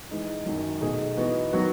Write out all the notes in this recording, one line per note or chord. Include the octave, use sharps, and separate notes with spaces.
E3 G#3 D#4
F#2 D#3 F#3
B2 A3 D#4 G#4
E3 B3 D#4 F#4
D#3 F#3 B3 F#4